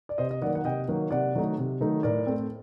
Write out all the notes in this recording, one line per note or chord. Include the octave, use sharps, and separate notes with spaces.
D5
C3 C5 D#5
D#5
D#3 F#3 A#3 D5 F#5
F#5
C3 D#5 G5
D#3 F#3 A#3
C3 D5 F#5
D#3 F#3 A3 D#4
C3
D#3 F#3 A3 D#4
A2 A#4 D5
A3 C4